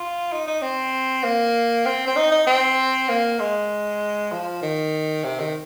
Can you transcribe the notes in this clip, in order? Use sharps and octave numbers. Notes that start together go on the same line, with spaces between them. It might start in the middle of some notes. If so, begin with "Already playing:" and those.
Already playing: F4
D#4
D#4
C4
A#3
C4
C4
D#4
D#4
C4
A#3
G#3
F3
D#3
C3
D#3